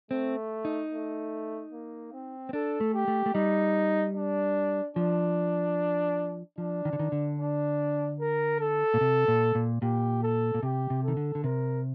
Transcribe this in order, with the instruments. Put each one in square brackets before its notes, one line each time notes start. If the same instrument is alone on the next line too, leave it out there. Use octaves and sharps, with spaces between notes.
[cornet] A3 [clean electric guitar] C4
[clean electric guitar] D#4
[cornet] A3
A#3
C4
[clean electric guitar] C4
[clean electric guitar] D4 [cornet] A4
[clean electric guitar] A3
[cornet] G4
[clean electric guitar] A3
A3
[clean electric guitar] G3 [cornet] D#4
[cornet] D4
[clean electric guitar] F3 [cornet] D4
[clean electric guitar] F3 [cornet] D4
[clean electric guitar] D#3
D3
D#3
D3
[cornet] D4
A#4
A4
[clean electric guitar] A#2
C3
A#2
A#2
[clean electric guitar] A#2 [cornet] G4
[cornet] A4
[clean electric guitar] A#2
[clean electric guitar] C3 [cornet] G4
[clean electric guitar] C3
[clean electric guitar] D#3 [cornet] A4
[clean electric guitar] D3
D3
[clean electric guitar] C3 [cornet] A#4